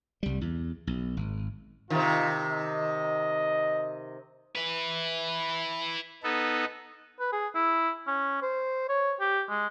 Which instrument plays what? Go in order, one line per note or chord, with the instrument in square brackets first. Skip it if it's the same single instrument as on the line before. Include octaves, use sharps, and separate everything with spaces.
[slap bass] C2 G3
E2
B1
G#1
[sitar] C3 D#3 [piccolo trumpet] F4
[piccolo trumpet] D#5
[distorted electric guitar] E4 B4
[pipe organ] B3 D#4 A4
[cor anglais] B4
G#4
E4
C#4
C5
C#5
G4
G#3